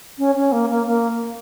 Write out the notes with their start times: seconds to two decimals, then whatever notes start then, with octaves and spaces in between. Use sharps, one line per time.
0.18 C#4
0.35 C#4
0.52 A#3
0.70 A#3
0.87 A#3